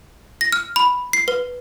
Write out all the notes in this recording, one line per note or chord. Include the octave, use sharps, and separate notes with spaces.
A#6
F6
B5
C7
B4